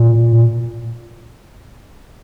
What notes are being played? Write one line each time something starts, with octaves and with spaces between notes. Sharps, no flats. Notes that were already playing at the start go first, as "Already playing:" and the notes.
Already playing: A#2